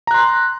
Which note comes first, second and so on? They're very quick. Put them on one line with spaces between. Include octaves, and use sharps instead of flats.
A#5 F#6 C6